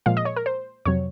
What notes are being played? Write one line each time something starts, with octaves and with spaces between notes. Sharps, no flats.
A#2 F3 G#3 F5
D#5
C#5
A#4
C5
F2 C3 F#3 C#5